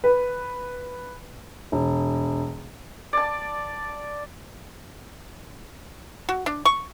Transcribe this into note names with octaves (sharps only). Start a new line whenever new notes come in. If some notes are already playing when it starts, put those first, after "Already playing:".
B4
E1
D5 A5
F#4
D4
C#6